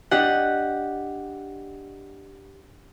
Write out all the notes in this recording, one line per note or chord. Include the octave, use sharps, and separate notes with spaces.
D4 G4 D#5 F#5